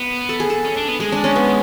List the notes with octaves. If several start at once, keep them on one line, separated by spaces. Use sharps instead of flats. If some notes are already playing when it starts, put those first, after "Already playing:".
Already playing: B3
A4
G#4
A4
C#4
D4
B3
G#3 G#4
D4
C#4
B3